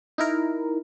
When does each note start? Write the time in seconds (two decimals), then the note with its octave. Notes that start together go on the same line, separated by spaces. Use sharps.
0.18 D#4 E4 A#4